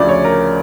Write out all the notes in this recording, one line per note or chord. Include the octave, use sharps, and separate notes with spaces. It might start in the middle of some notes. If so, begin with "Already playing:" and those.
Already playing: D2 C#3 F3 D5
C#5
A#4